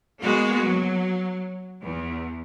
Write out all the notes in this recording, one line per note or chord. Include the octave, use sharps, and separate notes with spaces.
G#3 A#3 B3 F#4
F#3
E2